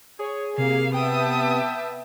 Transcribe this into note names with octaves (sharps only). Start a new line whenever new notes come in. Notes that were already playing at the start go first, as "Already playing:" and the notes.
G#4 C#5
C3 A#3 F5
B3 E5 G5 A5 D#6